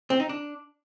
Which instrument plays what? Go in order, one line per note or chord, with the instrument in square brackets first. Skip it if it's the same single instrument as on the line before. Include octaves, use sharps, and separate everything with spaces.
[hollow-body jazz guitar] C4
D#4
D4